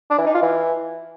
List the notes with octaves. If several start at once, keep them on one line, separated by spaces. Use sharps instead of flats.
D4
E3
D#4
F4
E3